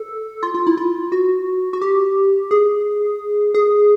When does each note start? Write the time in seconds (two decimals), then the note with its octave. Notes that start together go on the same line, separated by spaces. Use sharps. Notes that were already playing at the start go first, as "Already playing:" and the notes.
Already playing: A4
0.43 F4
0.54 F4
0.67 E4
0.78 F4
1.12 F#4
1.73 F#4
1.82 G4
2.51 G#4
3.54 G#4